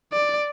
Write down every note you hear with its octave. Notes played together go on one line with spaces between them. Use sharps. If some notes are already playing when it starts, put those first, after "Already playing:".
D5